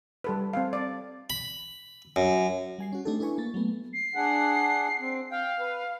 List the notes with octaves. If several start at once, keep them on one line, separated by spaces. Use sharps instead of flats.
G3 A4 B4
C4 A4 F5
D5
B5
F#2
G3 G#5 C7
C#4 F#4
A3 C4 D4 D#4 G4 A4
D4 E4 B4 G#5 C#6
A#3 A6
F#3 A3 B3
C7
D4 G#4 F#5
C4
F5 G5
B4